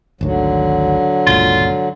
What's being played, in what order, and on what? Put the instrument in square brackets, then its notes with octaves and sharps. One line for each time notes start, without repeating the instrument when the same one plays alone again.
[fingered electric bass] G#1 D2 D#3 [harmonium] D3 F#3
[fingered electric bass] G1 C#2 A#2 [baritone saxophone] F4